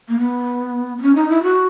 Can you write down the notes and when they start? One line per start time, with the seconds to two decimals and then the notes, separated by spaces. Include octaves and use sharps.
0.09 A#3
0.19 B3
0.98 B3
1.02 C#4
1.15 D#4
1.29 E4
1.43 F#4